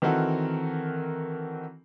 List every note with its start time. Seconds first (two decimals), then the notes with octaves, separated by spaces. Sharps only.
0.02 D#3 E3 C4 F#4 A4 A#4